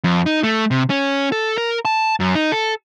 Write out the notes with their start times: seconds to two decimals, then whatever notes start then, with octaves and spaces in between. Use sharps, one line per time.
0.04 F2
0.26 D#4
0.43 A3
0.71 C3
0.90 C#4
1.32 A4
1.58 A#4
1.85 A5
2.20 F#2
2.35 D#4
2.52 A4